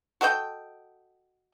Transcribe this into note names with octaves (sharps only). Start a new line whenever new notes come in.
F#4 A4 D#5 G5